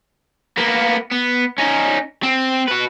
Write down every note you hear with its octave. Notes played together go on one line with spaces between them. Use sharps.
A#3 B3
B3
C#4 D#4
C4
F#4 B4